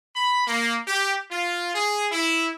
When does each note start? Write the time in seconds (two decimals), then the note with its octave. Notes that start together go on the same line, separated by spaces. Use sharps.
0.16 B5
0.47 A#3
0.87 G4
1.31 F4
1.74 G#4
2.11 E4